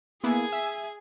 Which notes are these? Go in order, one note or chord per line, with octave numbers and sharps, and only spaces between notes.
A#3 B3 E4 G#4 G#5
E5